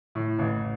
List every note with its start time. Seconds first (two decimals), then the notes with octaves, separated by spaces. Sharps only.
0.15 A2
0.39 A1